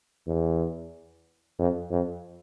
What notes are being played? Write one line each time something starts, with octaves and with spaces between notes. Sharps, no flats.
E2
F2
F2